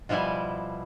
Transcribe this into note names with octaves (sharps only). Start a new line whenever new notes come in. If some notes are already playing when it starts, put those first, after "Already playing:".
B2 F3 G3 E4 G#5